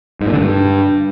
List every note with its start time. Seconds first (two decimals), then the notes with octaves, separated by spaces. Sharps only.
0.21 G#2
0.27 A#2
0.33 D3
0.39 G2